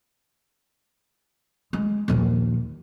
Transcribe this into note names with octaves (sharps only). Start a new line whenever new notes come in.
G#3
A#1 D#2